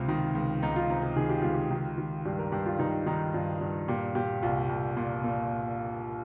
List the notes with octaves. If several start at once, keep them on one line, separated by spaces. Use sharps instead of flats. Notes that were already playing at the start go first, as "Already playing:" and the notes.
Already playing: C#2 C3 F4
D#3
C#2
C#2 D#4
F4
C3 D#4
D#4
D#3 G#4
G4
C#2 F4
G4
D#3
D#3
G2 G4
A#4
G2 G4
F4
D#3 D#4
D#3 D#4
G2 F4
G2
A#2 G4
A#2 G4
C2 F4
C2
A#2
A#2